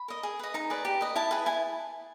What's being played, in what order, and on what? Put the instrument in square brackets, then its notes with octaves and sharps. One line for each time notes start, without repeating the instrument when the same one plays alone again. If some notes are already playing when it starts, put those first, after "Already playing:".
Already playing: [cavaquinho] B5
A#4 D#5
G#4
B4 D#5
D#4 A#5
G#4 B4 D5
G4
B4 D#5
E4 A5
G#4 B4
E4 G#5